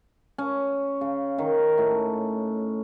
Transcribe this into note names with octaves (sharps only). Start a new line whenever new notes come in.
C#4
C#3
D#3
A2